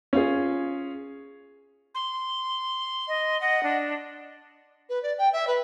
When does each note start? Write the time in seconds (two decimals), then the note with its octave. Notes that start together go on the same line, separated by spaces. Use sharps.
0.13 C#4 F4 G#4
1.95 C6
3.08 D#5
3.41 D#5 F#5
3.63 D4
4.89 B4
5.03 D5
5.18 G5
5.32 E5
5.47 B4